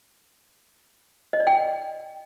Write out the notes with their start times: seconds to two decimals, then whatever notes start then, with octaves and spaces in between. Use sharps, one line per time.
1.33 D#5
1.40 D5
1.47 G5